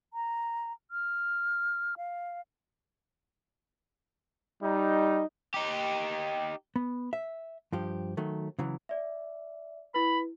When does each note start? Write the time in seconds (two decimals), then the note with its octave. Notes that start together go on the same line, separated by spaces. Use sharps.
0.14 A#5
0.91 F6
1.97 F5
4.62 G3 D#4
5.54 D#4 G4
6.76 B3
7.13 E5
7.73 G2 F3 G4
8.17 D#3 F#3 A3
8.59 C#3 E3 F#3
8.89 D5 E5
9.94 E4 B4 B5